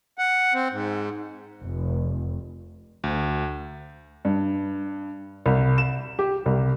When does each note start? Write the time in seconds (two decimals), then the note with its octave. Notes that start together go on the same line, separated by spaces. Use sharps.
0.18 F#5
0.54 C4
0.72 G#2
1.63 F1
3.04 D2
4.25 G2
5.46 C2
5.78 E7
6.19 G4
6.46 C2